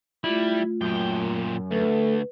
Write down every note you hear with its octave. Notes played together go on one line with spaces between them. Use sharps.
G3 A3 E4 F4
F#2 A#2 G5
D2 A3 B4